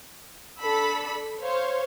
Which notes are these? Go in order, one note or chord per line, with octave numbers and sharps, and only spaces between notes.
D4 A4 B5 E6 B6
C5 C#5 F5